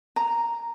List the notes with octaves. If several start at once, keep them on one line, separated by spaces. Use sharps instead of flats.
A#5